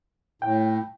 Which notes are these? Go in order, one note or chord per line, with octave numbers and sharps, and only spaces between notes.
A2 G5